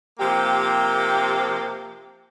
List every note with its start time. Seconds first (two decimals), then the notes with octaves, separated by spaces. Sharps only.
0.20 C3 F3 A#3 G4